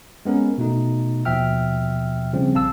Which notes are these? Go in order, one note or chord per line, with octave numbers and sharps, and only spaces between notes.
G#3 B3 C#4 A#4
B2 A3 D#4
D#2 B2 F3 E5 G5 F6
C#3 F3 G3 C4
A#1 F5 A5 E6